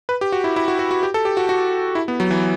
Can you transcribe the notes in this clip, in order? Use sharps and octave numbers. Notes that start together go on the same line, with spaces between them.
B4
G4
F#4
E4
E4
F#4
F#4
F#4
G4
A4
G4
F#4
F#4
E4
B3
F#3
E3